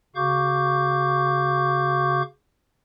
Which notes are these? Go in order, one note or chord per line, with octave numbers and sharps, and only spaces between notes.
C#3 F#4 F5 C#6 D6 G6